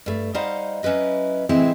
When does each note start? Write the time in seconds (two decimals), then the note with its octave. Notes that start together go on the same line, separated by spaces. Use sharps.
0.06 G2 A3
0.34 G3 D#4 C5 F5 F#5
0.83 F#3 C#4 E4 B4 D#5
1.49 A2 C3 E3 G#3 C4 E4